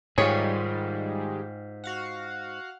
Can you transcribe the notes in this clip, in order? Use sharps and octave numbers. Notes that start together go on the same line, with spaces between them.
G#2 D#3 G3 G#3 F4 G4 G#4 C#5
F#4 F5 F#5